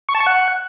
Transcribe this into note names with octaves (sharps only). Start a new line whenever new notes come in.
C#6
A5
C#6
F#5